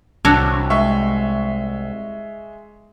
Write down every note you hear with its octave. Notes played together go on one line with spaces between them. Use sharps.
C2 D4 F#4 C#5 E6
G#3 E5 C#6